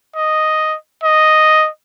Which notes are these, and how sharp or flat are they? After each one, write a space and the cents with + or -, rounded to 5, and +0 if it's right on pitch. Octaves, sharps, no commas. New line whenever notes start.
D#5 +0
D#5 +0